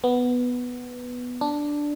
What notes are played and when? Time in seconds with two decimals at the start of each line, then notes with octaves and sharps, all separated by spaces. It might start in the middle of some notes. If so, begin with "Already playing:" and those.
0.04 B3
1.41 D4